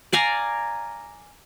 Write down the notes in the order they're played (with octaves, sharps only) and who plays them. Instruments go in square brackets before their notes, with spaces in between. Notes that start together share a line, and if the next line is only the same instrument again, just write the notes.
[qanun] D5 F5 G#5 A#5